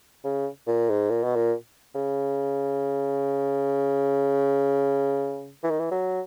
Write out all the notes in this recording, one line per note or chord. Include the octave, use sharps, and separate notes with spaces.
C#3
A#2
G#2
A#2
B2
A#2
C#3
E3
D#3
E3
F#3